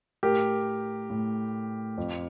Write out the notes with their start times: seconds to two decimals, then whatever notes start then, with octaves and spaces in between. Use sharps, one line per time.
0.23 A2 G4 A#4
1.10 A2
1.98 F2